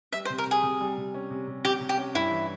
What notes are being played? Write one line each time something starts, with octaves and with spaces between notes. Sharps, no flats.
G3 E5
C5
C3
A#4
C3 G#4
C3
G3
C3
C#4
C3
C3
C3 G4
C3
G4
C#4
G2 E4
E3